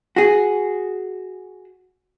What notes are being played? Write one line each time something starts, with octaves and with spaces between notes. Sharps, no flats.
F#4 G#4